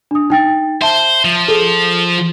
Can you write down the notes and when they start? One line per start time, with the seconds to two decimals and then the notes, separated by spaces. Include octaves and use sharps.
0.11 D4 D#6
0.30 D#4 G5 A6
0.82 C5 E5 A5
1.25 F3
1.48 G#4 A4